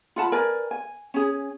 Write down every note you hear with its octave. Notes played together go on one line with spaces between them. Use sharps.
F4 F#5 A5 B5
A#4 B4 D5 G#5
G#5
C#4 G#4